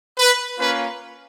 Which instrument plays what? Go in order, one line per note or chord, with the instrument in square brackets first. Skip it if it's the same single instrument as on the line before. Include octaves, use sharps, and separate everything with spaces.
[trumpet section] B4
A#3 C#4 F4 B4